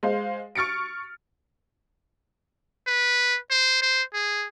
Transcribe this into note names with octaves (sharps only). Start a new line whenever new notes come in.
G#3 C5 F5
C#6 F6 A6 C#7 D7
B4
C5
C5
G#4